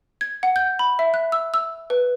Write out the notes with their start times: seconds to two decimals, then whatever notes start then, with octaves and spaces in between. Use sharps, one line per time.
0.21 G#6
0.43 F#5
0.56 G6
0.79 B5
0.99 E5
1.14 F#6
1.32 E6
1.54 E6
1.90 B4